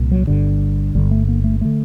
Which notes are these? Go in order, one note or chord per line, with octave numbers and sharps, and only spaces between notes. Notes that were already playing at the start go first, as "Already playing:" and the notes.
Already playing: C2 A#2
F#3
G1 G2 D3
G1 G2 D3 G3
A3
A#3
A3
D3 A3